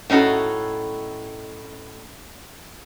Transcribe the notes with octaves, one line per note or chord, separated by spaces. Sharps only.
A2 C#4 D#4 F#4 A4